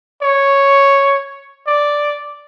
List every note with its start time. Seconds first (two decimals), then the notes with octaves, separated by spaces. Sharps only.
0.22 C#5
1.67 D5